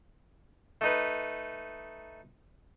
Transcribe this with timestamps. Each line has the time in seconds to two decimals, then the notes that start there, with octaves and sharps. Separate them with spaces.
0.81 A3 D#4 B4